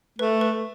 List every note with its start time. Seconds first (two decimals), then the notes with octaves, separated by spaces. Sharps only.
0.19 A3 B4
0.41 B4